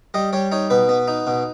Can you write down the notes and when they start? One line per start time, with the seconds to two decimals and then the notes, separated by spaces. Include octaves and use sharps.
0.14 G3 D#5
0.33 G3 C#5
0.52 D#4 C#5
0.70 B2 B4
0.89 B3
1.08 D#4
1.27 B2